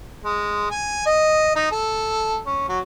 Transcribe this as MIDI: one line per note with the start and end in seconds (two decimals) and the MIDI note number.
0.24 0.70 56
0.70 1.03 80
1.06 1.52 75
1.56 1.69 63
1.71 2.39 69
2.46 2.67 61
2.69 2.79 54